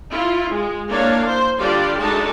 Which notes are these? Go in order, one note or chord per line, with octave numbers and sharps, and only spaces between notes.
E4 F4
G#3
A#3 D4 E4 C#5 F5
C5
D3 G3 D4 F4 G4 D5
G#3 A3 D4 D#4 F#4 A5